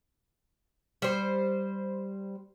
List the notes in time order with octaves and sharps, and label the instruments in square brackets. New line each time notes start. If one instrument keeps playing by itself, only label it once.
[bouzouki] G3 C5